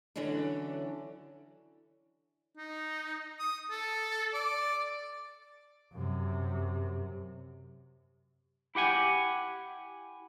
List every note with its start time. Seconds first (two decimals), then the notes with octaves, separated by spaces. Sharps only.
0.16 D3 E3 F#3 C#4 D4
2.57 D#4
3.39 D#6
3.70 A4
4.34 D5
5.93 F#2 C3
8.75 E4 G4 F#5 G#5